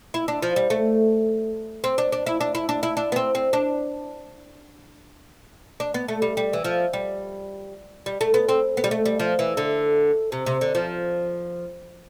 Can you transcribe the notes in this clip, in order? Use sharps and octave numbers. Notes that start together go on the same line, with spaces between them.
E4
D4
F3
G3
A3
C4
D4
D4
E4
D4
E4
D4
E4
D4
B3
C4
C4
D4
D4
B3
A3
G3
G3
E3
F3
G3
G3
A3
B3
C4
B3
G3
A3
G3
F3
E3
D3
C3
C3
D3
F3